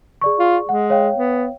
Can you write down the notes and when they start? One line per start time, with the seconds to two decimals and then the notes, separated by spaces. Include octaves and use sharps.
0.21 G#4 D5 C#6
0.39 F4
0.69 G#3 F#5
0.90 C#5 F5 G5
1.15 B3